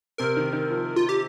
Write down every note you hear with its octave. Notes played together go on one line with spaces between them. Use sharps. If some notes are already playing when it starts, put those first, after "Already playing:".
C3 A#4
D#3
D#3
F3
F4
G4